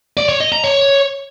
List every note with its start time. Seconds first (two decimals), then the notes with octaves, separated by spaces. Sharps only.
0.17 D5
0.29 C#5
0.40 D#5
0.52 A#5
0.64 C#5